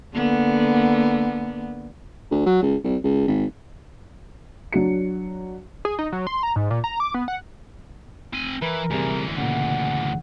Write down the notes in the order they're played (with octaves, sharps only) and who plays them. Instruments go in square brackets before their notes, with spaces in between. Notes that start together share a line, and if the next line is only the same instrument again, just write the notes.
[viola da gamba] D3 A#3 B3
[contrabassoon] D2
F#3
C#2
C2
C#2
G#1
[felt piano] F#3 D4 F#4 C#7
[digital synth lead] G#4
D#4
F#3
C6
A#5
G#2
A#2
A#5
D6
B3
F#5
[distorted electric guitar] C4 G#5
[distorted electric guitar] E3 [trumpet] A#4 [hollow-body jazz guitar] B4
[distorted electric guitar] D2 E3 [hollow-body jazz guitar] C3 G3 G#4
[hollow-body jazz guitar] A#2 C#3 [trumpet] F#5